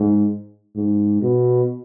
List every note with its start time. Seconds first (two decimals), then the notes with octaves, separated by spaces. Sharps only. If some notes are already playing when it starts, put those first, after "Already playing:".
Already playing: G#2
0.76 G#2
1.22 B2